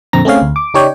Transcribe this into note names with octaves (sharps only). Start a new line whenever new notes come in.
F2 A#2 D3 C4 A#5 A#6
A3 C4 C#4 G#4 C#5 F5
D2
D6
C#3 D#4 G4 C#5 D5 G5